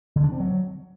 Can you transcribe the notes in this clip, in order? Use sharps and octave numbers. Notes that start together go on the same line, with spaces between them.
D3
D4
C4
F#3